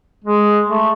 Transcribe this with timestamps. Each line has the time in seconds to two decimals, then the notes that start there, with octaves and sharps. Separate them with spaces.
0.24 G#3
0.68 A3